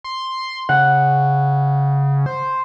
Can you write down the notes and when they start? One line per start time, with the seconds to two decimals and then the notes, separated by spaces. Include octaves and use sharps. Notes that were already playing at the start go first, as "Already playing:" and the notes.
0.04 C6
0.69 C#3 F#5
2.26 C5